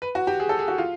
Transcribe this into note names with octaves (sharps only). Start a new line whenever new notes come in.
B4
F#4
G4
G#4
A4
G#4
F#4
F4